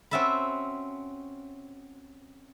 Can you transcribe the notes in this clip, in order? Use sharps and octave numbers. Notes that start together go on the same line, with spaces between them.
C4 C#4 F#4 E5 A5 B5